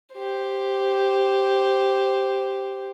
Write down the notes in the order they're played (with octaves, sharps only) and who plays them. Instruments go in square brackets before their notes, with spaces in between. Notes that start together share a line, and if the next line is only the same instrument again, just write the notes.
[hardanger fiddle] G4 C5